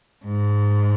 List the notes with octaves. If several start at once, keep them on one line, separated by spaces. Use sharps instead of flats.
G#2